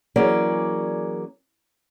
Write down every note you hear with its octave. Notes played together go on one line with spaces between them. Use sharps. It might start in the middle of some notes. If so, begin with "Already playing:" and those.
E3 F#3 A#3 C#4 G#4 D5